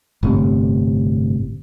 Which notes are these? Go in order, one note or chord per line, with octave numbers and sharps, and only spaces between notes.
G1 A2 C3